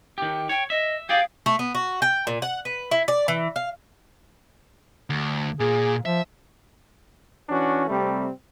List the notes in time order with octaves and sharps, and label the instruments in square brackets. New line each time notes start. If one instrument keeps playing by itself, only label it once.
[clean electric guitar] D#3 G4
[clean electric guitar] C#5 [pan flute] G5
[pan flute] D#5 [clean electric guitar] E5
[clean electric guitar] G4 G#4 D5 [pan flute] F5
[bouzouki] A3
B3
F#4
G5
A#2
F#5
B4
E4
D5
E3
F5
[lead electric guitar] D2
[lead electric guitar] A#2 [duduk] G#4
[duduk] F3 [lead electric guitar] E5
[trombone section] E3 C#4 D4 F#4
C3 G3 A3 C4